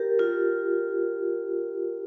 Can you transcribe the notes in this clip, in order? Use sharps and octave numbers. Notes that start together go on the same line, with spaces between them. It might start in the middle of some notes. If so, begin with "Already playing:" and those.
Already playing: G4 A#4
F4